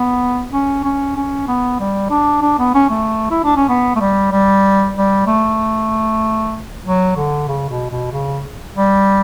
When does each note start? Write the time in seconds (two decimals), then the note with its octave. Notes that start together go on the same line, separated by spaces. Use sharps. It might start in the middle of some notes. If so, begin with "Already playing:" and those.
Already playing: B3
0.52 C#4
0.84 C#4
1.16 C#4
1.48 B3
1.80 G3
2.10 D4
2.42 D4
2.59 B3
2.74 C#4
2.90 A3
3.30 E4
3.44 D4
3.56 C#4
3.69 B3
3.96 A3
4.00 G3
4.32 G3
4.96 G3
5.27 A3
6.85 F#3
7.17 D3
7.48 C#3
7.70 B2
7.90 B2
8.12 C#3
8.75 G3